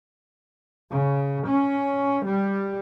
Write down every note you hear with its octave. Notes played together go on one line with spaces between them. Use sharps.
C#3
C#4
G3